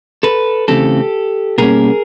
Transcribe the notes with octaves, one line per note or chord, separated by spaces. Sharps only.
A4 B4
C#3 E3 A3 C4 G4 A4
B2 G3 A#3 C#4 G#4 A#4